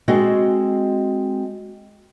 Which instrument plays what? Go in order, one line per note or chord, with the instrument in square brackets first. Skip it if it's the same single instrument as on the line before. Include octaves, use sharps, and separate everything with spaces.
[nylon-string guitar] G#3 C4 F#4 G#4 A4 D#5